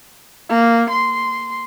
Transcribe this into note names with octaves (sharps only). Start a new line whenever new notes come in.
A#3
C6